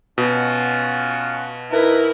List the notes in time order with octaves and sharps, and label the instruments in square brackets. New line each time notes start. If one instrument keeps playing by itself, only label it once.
[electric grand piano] B2 [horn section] C#4 F4 F#4
[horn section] D#4 B4 [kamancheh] E4 A#4